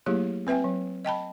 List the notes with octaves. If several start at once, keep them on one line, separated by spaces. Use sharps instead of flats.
F#3 A3 A#3 E4 G4 G#4
C4 B4 E5 G5 G#5
F#3
D#5 G5 A5 B5